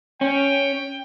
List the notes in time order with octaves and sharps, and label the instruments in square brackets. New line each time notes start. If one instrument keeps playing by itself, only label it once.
[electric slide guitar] C#4 [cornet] G5